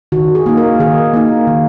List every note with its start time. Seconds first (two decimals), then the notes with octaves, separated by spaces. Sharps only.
0.12 D#3 F#4
0.35 G#4
0.46 A#3 D#4
0.57 A#4
0.80 D#3 G#4
1.14 A#3 D#4
1.47 D#3